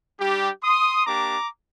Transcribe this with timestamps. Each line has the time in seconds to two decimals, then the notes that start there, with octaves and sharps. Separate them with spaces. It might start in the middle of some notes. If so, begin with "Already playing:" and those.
0.19 G3 D4 G4
0.63 C6 D#6
1.06 A#3 D4 G4 A#5 D6